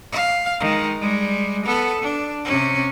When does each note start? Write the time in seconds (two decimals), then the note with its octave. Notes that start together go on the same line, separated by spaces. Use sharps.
0.12 F5
0.60 D#3 G#3
1.01 G3 G#3
1.66 B3 A4
2.02 D4
2.45 C3 C#4